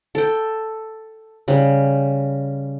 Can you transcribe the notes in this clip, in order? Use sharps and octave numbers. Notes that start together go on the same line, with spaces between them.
A4 G5
C#3 G3